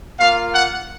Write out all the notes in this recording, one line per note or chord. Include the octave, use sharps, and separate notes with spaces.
A#3 F4 F5
F#5